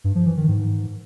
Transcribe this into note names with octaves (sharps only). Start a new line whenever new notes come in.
G2
F3
E3
D#3
G#2